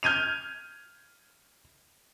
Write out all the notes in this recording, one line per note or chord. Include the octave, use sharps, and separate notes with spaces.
F6 G6 G#6 D#7 F7